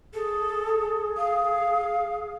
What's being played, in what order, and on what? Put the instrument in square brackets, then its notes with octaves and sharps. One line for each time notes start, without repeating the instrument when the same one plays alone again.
[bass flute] G#4 [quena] A4
[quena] F5